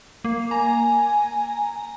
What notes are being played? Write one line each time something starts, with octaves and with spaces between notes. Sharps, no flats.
A#3
G#5 A#5